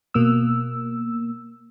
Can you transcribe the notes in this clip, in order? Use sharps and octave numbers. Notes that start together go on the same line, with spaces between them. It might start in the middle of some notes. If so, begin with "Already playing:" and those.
B2 A#3 E6